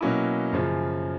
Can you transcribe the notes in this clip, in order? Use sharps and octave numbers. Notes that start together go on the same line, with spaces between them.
B2 F#3 A#3 C#4 E4
F#2 C#3 F3